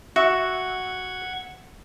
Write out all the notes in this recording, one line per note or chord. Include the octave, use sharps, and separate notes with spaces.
F#4 E5 F#5 G#6